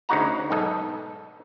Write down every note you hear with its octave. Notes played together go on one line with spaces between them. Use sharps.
D2 C#3 D#4 F#4 F#5 A#5
B1 G#2 A4 D#5